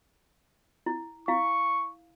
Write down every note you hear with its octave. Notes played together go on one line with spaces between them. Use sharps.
E4
E4 F5 C#6